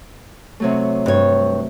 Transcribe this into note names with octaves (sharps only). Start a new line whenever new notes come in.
C3 F#3 A3
G2 C#5